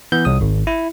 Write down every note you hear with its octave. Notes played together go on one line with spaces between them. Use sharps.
E3 B3 G6
C2 D#6
G#1
E4